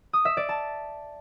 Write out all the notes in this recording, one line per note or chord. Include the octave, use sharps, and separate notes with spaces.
D#6
E5
D5
A5